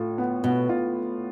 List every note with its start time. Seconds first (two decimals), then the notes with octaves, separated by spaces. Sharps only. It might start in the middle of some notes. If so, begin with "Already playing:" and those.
Already playing: A2 F4
0.18 B3
0.44 B2 B3
0.69 F4